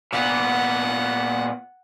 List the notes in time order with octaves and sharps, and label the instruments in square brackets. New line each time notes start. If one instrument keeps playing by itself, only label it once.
[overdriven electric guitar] A#2 B3 [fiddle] F#5